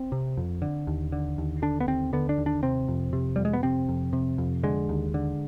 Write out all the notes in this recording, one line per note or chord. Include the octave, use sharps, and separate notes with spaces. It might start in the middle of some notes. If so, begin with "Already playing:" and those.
Already playing: C4
C3
F2
D3
D#2
D3
D#2
D3 D4
B3
D#2 C4
D3 B3
D4
D#2
D4
C3 C4
F2
C3
F2 G3
G#3
B3
C3 C4
F2
C3
F2
D3 G#3
D#2
D3